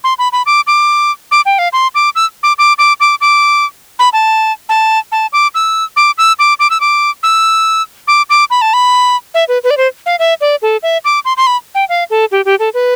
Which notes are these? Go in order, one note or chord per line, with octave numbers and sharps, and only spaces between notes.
C6
B5
B5
D6
D6
D6
G5
F5
C6
D6
E6
D6
D6
D6
D6
D6
B5
A5
A5
A5
D6
E6
D6
E6
D6
D6
E6
D6
E6
D6
D6
B5
A5
B5
E5
B4
B4
D5
C5
F5
E5
D5
A4
E5
D6
C6
C6
B5
G5
F5
A4
G4
G4
A4
B4